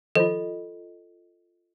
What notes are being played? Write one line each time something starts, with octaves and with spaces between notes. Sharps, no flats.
D#3 F3 F4 A4 C5 D#5